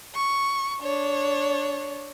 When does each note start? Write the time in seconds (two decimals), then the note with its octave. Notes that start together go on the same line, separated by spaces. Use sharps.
0.15 C#6
0.81 D4 C#5